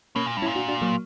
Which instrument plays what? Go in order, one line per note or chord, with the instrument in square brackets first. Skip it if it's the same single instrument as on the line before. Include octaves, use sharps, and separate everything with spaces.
[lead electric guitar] B2 [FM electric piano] A#3 C#4
[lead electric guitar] A#2
G2
[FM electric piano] C#4 E4
[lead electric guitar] A#2
[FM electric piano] D4 F#4
D4 F#4
F#3 A#3